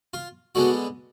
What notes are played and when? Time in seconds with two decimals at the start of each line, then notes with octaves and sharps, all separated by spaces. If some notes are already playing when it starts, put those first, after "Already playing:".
0.14 F4
0.55 D3 G#3 B3 F#4